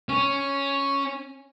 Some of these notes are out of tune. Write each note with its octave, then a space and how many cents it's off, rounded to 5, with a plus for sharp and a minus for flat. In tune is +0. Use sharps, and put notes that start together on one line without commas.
C#4 +0